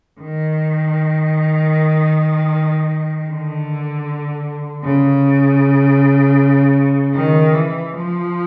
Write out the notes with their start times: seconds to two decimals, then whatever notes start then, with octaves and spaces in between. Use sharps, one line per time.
0.20 D#3
3.29 D3
4.83 C#3
7.15 D#3
7.53 E3
7.93 F3